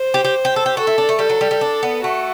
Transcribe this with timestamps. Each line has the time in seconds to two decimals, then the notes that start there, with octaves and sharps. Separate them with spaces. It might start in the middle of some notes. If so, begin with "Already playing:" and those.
Already playing: C5
0.14 G4
0.25 G4
0.45 G4
0.56 A4
0.66 G4
0.77 F#4 A4
0.87 E4
0.98 D4
1.09 A3
1.19 G3 A4
1.29 F#3
1.41 G3
1.51 G3
1.61 D4
1.83 B3
2.04 A3 F#4